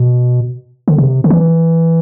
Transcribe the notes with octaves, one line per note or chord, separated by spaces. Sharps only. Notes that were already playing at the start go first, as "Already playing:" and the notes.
Already playing: B2
D3
C3
D3
E3